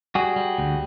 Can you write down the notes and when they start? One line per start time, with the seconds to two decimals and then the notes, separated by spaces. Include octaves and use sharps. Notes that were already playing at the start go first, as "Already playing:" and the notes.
0.15 G3 F#4 G#4
0.36 G3
0.58 D2